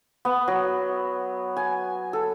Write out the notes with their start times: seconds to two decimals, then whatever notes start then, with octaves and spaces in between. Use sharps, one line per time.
0.25 B3
0.48 F#3
1.57 G#5
2.13 A4